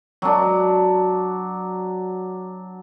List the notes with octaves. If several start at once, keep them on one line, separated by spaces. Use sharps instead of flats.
F#3 D4